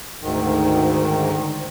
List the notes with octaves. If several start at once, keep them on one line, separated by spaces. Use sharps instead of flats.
D2 G#2 D#3